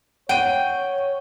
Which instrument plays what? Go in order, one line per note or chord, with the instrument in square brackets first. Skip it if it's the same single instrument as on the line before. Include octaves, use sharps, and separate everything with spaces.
[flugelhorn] C#5 [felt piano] F#5 D#7 [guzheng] G5